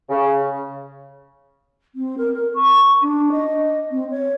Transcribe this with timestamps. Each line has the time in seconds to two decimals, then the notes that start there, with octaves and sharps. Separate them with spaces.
0.09 C#3
1.95 C4
2.18 A#4
2.34 A#4
2.55 C#6
3.02 D4
3.32 D#5
3.91 C4
4.11 C#5